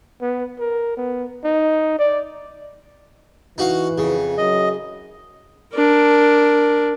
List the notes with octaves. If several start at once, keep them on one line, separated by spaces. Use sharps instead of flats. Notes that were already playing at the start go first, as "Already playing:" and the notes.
B3
A#4
B3
D#4
D5
E3 D#4 F#4 F5
F2 C#3
F#2 D#5
D4 A#4